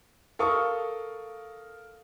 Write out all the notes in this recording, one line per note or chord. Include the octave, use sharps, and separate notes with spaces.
A4 A#4 F5 C#6 D#6